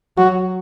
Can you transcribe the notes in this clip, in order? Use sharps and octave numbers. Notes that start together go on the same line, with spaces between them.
F#3 F#4